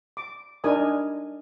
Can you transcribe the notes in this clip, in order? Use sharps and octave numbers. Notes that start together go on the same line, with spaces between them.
D6
D4 D#4 A#4 D5 G#5 D#6